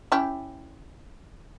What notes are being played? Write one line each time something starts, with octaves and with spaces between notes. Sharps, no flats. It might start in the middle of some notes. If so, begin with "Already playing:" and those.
C#4 E4 G4